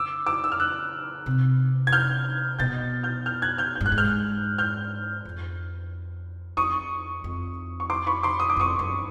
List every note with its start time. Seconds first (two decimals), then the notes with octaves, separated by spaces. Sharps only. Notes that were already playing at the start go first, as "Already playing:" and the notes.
Already playing: C#3 D6 E6
0.26 D6 E6
0.44 E6
0.52 F6
0.60 E6 F#6
1.26 C3
1.87 G#6
1.93 F6 G6
2.59 B2 G6 A6
3.03 F6 G6
3.26 F6 G6
3.42 F#6 G#6
3.58 F6 G6
3.75 G6
3.80 G2
3.86 F#6
3.92 G#2
3.98 F6 G6
4.58 F6 G6
5.25 F2
6.57 F2 C#6 D#6
7.24 F2
7.80 C#6
7.90 C6 D6
8.06 B5 C#6
8.23 C6 D6
8.40 D#6
8.50 D6
8.56 F2 C#6 D#6
8.79 F#2